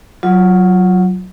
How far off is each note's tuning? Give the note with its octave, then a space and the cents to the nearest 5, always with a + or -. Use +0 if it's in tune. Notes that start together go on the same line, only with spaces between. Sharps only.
F#3 +0 F4 +0